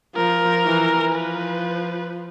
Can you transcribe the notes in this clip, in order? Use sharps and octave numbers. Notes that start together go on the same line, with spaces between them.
F3 A#4
E3
F3 B4